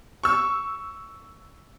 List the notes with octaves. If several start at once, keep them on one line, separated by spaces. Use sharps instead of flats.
C#6 E6